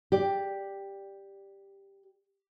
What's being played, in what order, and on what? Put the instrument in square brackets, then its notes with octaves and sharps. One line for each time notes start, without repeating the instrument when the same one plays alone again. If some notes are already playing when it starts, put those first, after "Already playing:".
[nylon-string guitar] G4 D5